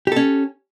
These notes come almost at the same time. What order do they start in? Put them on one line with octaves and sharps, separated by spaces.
G4 A4 C#4